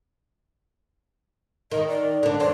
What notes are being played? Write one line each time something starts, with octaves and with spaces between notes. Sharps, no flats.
D#3 D#5
D5
D3 D4
E2 C4 D5